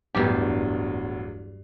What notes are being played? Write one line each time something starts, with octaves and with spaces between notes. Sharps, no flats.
D1 E2 G2 G4